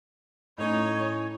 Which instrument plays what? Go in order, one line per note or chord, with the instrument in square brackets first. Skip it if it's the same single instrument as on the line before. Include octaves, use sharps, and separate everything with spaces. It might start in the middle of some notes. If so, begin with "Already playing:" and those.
[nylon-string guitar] A2 C#4 [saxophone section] D#4 [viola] C#5